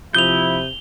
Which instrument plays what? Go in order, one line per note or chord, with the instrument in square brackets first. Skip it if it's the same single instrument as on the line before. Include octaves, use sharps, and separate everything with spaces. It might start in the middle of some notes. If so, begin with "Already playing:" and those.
[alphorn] C3 [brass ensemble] F3 E4 [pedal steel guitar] D#6 G6 [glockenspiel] F7 G7